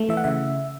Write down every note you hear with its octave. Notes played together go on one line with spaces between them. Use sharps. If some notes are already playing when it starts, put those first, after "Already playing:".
Already playing: A3
E3 E5
F#5
C#3 E5